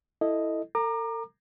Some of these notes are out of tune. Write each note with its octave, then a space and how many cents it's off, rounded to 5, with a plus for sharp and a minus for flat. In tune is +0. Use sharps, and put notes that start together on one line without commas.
E4 -5 A4 +0 D#5 +0
A4 +45 A#5 +0 D6 +35